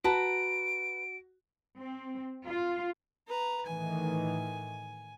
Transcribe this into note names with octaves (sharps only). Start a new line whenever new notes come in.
F#4 B4 A5 A#5 D7
C4
F4
B4 A#5
A2 D#3 E3 G#5